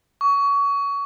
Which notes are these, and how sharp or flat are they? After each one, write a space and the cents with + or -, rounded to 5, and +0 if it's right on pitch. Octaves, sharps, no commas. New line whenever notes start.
C#6 +25